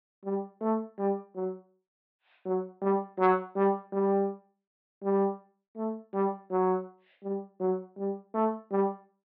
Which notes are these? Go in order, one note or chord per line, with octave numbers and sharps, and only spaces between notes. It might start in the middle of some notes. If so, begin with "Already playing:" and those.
G3
A3
G3
F#3
F#3
G3
F#3
G3
G3
G3
A3
G3
F#3
G3
F#3
G3
A3
G3